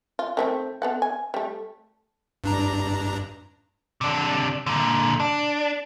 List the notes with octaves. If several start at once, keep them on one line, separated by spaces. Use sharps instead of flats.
F4
D#3 A3 C4
B3 A4 F#5
G#5
G3 A3
G2 D4 A#5
C3 D4
A#2 D3
D4